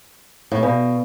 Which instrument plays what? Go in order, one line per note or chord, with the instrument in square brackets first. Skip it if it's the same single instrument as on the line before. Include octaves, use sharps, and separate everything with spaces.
[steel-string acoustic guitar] A2
[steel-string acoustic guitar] B2 [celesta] B4 D5 F5 G#5 B5